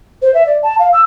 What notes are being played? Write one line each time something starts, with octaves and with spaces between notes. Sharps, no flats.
C5
E5
D5
A5
F5
E6